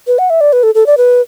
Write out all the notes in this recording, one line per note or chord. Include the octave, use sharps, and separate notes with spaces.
B4
F#5
E5
D5
B4
A4
A4
D5
B4